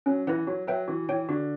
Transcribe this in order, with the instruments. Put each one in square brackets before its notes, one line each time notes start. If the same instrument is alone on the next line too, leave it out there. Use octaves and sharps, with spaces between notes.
[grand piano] F#3 [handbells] C#4
[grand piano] E3 [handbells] E4 B4 F#5
[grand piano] F#3 [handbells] F#4
[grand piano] F#3 [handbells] B4 E5 G5
[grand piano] E3 [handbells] F#4
[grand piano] E3 [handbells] C#5 G5
[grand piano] D3 [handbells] F#4